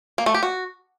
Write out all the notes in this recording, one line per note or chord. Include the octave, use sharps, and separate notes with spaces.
A#3
A3
G4
F#4